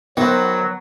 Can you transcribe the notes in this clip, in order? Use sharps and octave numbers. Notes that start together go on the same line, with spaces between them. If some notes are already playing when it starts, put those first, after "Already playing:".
D#3 F#3 B3 F#4 C5